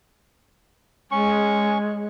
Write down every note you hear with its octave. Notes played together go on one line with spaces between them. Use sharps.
G#3 C#4 C#6